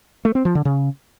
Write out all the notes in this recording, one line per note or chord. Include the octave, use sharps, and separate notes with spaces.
A3
C4
F3
D3
C#3